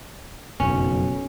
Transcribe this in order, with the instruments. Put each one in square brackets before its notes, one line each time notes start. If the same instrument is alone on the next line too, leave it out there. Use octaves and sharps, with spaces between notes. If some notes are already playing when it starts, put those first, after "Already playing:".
[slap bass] F#1 F2 [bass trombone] B1 [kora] C#4